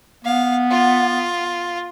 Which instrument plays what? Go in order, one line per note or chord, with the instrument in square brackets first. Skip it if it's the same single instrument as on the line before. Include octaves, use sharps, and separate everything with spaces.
[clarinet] B3 [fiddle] F5
[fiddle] F4